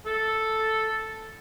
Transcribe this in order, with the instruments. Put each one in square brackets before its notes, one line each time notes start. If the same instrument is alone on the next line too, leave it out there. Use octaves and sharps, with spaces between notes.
[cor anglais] A4